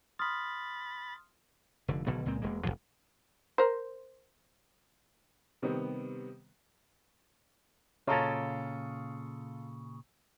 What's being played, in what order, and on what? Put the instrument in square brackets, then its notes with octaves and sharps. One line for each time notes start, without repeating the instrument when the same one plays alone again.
[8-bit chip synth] B5 A6 [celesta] C6 D#6 F6
[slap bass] F1 D3
G#1 B2 D3 F#3
C#2 A#2 G#3 C4
E1 G#3 A#3
F1 G2 F3 A3
[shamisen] A#4 C5
[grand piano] C3 D#3 G3 B3 C4
[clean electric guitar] A#2 C#3 [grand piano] F4 A4 [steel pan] C#5 A#5 C#6